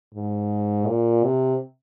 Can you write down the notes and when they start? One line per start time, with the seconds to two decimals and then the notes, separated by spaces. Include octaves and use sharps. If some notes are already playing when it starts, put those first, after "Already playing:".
0.15 G#2
0.88 A#2
1.24 C3